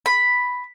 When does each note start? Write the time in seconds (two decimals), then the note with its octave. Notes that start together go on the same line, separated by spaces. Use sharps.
0.06 B5